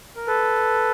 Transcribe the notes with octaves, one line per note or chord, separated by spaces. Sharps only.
A#4
A4 B4